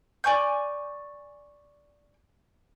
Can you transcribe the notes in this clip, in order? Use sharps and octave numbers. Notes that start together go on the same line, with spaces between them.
D5 G#5 C#6 G6